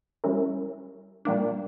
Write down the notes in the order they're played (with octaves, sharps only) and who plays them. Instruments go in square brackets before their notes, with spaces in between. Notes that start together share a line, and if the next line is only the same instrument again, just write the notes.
[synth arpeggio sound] G3 C#4 E4 A#4
A#2 G3 A#3 D4